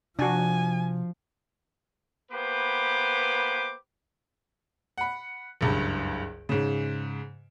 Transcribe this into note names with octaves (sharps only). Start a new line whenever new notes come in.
C3 F3 D4 F#4 G#5
A#3 B3 G4 B4 C5 D6
F#5 B5
F#1 C#2 G2
G#2 C#3